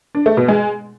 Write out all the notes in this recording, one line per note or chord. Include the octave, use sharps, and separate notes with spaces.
D4
A3
B2
G#3